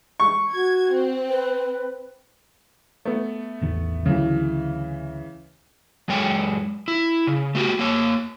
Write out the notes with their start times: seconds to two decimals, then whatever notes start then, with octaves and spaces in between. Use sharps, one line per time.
0.20 C#6
0.53 F#4 G#6
0.91 C4
1.29 B4
3.05 A3 B3
3.61 A1 E2 D#3
4.06 D2 C#3 E3 F#3
6.08 F#2 G#3 C#5 G5
6.88 E4
7.27 C#3
7.55 A3 F#4 G4
7.79 A#3 C#5